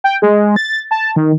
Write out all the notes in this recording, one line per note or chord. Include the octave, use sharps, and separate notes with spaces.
G5
G#3
A6
A5
D#3